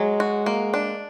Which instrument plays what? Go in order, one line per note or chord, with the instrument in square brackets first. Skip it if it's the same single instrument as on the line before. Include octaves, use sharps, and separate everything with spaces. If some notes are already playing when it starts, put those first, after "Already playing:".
Already playing: [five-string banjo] F#3 [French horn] G#3
[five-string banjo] F#4
A#3
D4